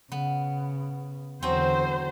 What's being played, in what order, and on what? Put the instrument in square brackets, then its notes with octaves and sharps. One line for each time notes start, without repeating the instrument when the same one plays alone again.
[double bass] C#3 [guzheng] B3
[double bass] E2 D3 [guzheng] F#3 C4 [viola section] C5